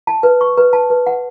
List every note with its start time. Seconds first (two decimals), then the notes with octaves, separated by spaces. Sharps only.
0.07 A5
0.23 B4
0.41 C#6
0.58 B4
0.73 A5
0.90 B4
1.07 F#5